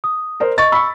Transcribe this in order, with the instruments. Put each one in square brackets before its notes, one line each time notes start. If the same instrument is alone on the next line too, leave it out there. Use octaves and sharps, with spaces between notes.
[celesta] D#6
[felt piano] A#4 C5
[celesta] D#5 C#6 [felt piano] A6
[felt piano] B5 C#6 [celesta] E6